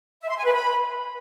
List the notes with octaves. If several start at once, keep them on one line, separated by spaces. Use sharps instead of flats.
E5
C6
G#5
B4
B5